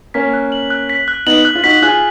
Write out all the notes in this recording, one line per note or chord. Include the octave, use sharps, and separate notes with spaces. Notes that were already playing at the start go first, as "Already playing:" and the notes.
A#3 C#4 B6
F#6
F#7
F#6
B6
F#6
B3 D#4 F#7
F#6
F4
D#4 F#4 B6
F4 G#4 F#6